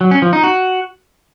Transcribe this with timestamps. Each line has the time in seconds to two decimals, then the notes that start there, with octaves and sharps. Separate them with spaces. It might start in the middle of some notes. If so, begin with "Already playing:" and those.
0.01 F#3
0.11 C#4
0.22 F3
0.33 D#4
0.43 F#4